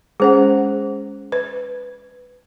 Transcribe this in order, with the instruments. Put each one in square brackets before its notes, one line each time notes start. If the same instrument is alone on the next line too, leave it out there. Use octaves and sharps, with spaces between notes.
[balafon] G#3 C#4 F#5 [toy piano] G#4 C5
[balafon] B4